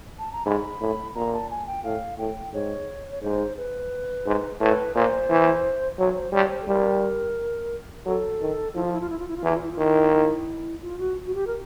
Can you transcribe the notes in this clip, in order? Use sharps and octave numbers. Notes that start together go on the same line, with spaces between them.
A5
A#5
G#2 B5
A2
A#2 A#5
A5
G#5
G5
A2 F5
A2 G5
G#2 C#5
C#5
G#2 C5
B4
G#2
A2 B4
A#2 C5
E3
F#3 C#5
C5
G3 C#5
C5
A4
G3 A#4
F#3 A4
D#3
F3 E4
F4
E4
F4
E4
F4
E4
F4
E3 E4
F4
E4
F4
D#3 E4
E4
F4
F#4
F#4
G4
A#4